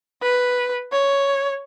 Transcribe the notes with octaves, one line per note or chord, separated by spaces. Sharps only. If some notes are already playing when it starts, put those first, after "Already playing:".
B4
C#5